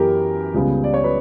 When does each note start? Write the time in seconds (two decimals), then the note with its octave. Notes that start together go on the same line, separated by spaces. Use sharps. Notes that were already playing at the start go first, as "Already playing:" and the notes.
Already playing: F#2 E3 B3 G4 A#4
0.54 C#2 C#3 G3 B3
0.84 D5
0.94 C#5
1.04 B4